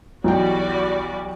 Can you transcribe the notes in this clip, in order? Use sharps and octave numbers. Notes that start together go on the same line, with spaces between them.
B1 E3 G3 F#4 D5 G5